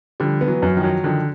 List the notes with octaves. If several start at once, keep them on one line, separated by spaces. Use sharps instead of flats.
D3 F3 G3
B3
E3 F#3
F#2 F#3
D#3 F3
F#3
D3 D#3 F3